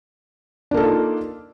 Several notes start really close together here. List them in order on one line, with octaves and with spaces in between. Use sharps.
D4 A#3 A4 D#4 F4